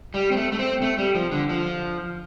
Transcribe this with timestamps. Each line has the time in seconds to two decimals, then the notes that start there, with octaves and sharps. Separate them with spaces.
0.14 G3
0.31 C4
0.37 A3
0.52 A3
0.59 C4
0.82 A3
0.98 G3
1.15 F3
1.32 D3
1.49 F3